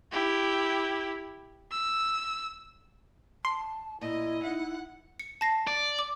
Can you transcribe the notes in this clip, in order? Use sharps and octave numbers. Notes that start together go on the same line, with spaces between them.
E4 G4
E6
A5 C6
A#2 E4 D#5
D#4 E5 F#5
C#7
A5 A#6 C7
D5
D6